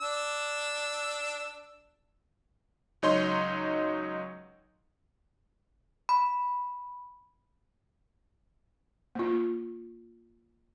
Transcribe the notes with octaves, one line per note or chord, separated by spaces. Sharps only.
D4 E6
C#2 F#3 D#4 C#5 D#5 C6
B5
A#3 F4